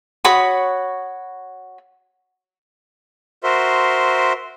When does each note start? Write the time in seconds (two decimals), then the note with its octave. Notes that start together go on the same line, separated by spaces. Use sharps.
0.25 F#4 C#5 B5 D#6
3.44 F#4 A#4 C5 E5 C6